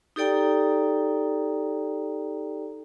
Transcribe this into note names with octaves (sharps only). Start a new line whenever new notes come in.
D#4 G4 A4 D5 G5 A#5